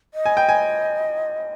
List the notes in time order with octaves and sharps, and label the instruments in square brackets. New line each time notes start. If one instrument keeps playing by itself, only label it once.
[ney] D#5
[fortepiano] G#5
G5
G#5